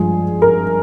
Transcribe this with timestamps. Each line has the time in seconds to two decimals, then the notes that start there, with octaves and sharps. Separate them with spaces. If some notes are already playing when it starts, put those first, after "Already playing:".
Already playing: G2 F3 G#3 G#4
0.42 A#4